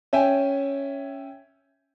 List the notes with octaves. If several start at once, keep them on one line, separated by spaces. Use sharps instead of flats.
C#4 E5 G5 G#5